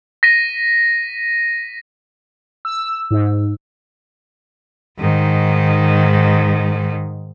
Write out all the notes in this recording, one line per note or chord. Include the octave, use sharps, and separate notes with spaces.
A#6 B6 D#7
E6
G#2
G#2 D#3